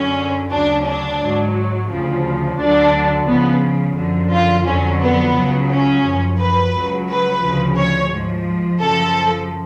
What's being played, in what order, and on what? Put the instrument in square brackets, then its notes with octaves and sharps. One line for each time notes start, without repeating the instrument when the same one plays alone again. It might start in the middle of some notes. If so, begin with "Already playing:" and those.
Already playing: [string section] F#2 D3 F#3 C#4
D2 C#3 F#3 D4
D4
G#2 F#3
D2 C#3 F3
D2 D3 F#3 D4
C#2 C#3 F3 B3
F#2 D3 F3
F4
F2 D3 F#3 C#4
B3
C#2 C#3 F#3
C#4
F#2 F3
B4
C#2 C#3 F#3
B4
D2 C#3 F3
C#5
G#2 F3
F#2 C#3 F3 A4